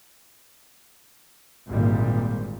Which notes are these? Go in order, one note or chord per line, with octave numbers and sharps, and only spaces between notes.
G#1 D2 A#2 G3